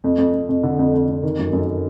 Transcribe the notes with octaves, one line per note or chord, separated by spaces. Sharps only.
F2
F2
F2
F2
D3
F2
F2
F2
D#3
F#2
F#2